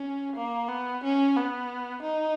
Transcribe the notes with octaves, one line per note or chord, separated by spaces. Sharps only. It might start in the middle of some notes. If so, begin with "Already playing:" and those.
Already playing: C#4
A#3
B3
C#4
B3
D#4